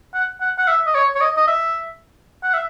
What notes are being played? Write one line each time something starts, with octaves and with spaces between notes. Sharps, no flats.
F#5
F#5
F#5
E5
D#5
C#5
C#5
D#5
D#5
E5
F#5
E5